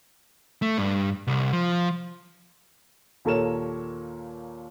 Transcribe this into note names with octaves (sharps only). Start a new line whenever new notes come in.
A3
G2
C2
F3
D#2 A#2 A4 A#4 C#5 E7